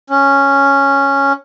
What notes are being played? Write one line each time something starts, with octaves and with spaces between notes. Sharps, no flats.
C#4